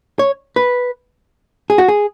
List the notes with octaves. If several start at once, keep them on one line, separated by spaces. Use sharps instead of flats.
C#5
B4
G#4
F#4
G#4